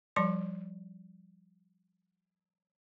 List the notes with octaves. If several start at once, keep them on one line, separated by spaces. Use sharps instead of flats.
F3 G3 D5 A5 C6